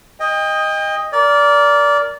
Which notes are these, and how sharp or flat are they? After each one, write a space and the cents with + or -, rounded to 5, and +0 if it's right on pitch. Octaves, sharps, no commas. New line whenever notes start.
D#5 +0 G5 +35
A#4 +0 D5 -20